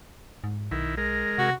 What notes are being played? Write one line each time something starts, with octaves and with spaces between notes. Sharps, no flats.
G#2
B1 D#3 E4
G#3 A#4
C3 F#4